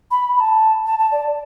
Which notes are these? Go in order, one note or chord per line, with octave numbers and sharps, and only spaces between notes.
B5
B5
A5
A5
A5
D5